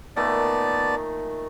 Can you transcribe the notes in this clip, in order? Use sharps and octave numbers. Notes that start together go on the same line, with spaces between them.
A#2 D#3 A3 B3 D5 A5